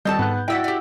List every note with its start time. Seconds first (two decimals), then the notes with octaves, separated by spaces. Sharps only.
0.05 D#1 G3 C4 A4 D#5 A5 G6
0.19 G#2 B3 F#6
0.48 F#3 E4 F#4 D5 F#5 G5 E6 B6
0.64 G4 D5